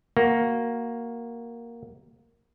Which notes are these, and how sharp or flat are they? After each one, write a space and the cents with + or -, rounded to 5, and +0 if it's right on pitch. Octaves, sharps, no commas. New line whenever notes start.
A#3 +0 F#4 +0